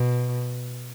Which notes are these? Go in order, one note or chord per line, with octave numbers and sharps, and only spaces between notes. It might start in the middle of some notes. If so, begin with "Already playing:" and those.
Already playing: B2